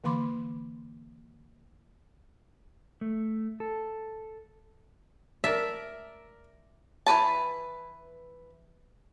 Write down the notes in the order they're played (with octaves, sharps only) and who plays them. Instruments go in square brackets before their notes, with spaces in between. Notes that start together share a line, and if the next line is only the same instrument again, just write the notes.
[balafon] D3 E3 A#3 B5 C6 D6
[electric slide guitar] A3
A4
[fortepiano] A#4 D5 [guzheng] E5 A5
[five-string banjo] E3 A#4 B4 A5